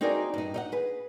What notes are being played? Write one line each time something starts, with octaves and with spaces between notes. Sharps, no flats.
C4 D#4 F#4 G#4 A#4 D5
G2 D#4
D#4 D#5 F#5
G#4 B4